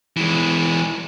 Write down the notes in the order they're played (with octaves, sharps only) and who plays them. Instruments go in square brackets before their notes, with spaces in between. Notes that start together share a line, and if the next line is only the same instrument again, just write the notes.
[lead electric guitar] E3 G#3